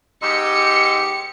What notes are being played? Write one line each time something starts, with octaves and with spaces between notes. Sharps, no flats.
G#2 G4 D#5 C6 E6 C#7